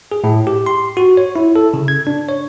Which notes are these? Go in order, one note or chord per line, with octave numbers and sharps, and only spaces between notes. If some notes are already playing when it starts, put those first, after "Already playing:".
G#4
A2
G4
C6
F#4
C#5
E4
A4
C#3
G#6
D4
C#5